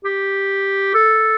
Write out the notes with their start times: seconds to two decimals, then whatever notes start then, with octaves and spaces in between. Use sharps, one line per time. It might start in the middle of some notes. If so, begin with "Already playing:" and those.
0.04 G4
0.94 A4